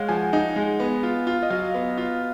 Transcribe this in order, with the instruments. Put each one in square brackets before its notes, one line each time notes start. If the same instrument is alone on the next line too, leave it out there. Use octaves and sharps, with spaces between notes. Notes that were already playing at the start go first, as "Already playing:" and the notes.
Already playing: [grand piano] G#3 [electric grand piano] C#5 F5 F#5
[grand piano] F3 [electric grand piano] G#5
[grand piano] D#4
G#3
B3
F4
F4
[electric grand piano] D#5
[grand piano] F#3 [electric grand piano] F5
[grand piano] B3
F4